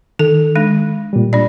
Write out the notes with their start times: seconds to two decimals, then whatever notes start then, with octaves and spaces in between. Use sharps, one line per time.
0.19 D#3 A4
0.56 G#3 D4
1.13 A#2 G3
1.33 D4 D5